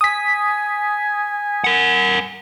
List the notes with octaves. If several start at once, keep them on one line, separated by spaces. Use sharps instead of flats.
G#5 D#6 B6
A#4 F#5